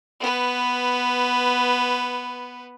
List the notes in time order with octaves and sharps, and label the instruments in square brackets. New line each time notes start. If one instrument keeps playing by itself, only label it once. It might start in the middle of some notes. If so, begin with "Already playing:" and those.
[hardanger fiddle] B3 B4